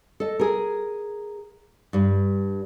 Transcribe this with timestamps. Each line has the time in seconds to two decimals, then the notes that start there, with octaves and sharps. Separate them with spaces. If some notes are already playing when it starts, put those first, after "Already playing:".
0.20 A4 D#5
0.40 G#4 A#4
1.93 G2 G3